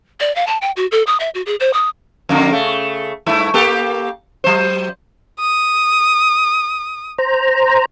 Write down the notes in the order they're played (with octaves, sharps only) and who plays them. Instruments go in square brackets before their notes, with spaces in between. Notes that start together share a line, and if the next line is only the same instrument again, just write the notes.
[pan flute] D5
F5
A5
G5
F#4
A4
D#6
E5
F#4
G#4
C5
D#6
[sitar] F2 D3 A#3
C#3 A3
G2 A3 E4
A#3 G4 A4
F#3 C5
[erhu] D#6
[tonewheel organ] C5 A#5